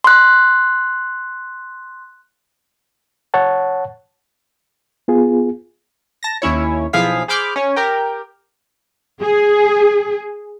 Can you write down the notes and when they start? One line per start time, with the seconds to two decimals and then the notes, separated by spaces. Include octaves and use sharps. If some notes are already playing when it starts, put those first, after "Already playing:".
0.04 C6 F#6
3.34 C#5 F#5 A5
5.08 B3 F4 G#4
6.23 A5 A#6
6.42 D#2 C#4 E4 C#5
6.93 B1 F3 E4 G#4 F5 B6
7.28 G#4 C5 B5 D6 F6 G6
7.56 C#4 C#5
7.76 G4 A#4 G5
9.21 G#4